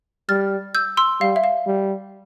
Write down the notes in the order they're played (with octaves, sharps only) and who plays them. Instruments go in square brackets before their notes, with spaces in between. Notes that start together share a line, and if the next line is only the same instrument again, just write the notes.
[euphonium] G3 [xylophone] F6 A6
[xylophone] E6 G6
C6 E6
[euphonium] G3 [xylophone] F5
[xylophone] E5
F5
[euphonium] G3